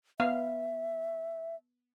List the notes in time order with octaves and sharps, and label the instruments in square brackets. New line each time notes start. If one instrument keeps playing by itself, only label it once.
[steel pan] B3 F5 [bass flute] E5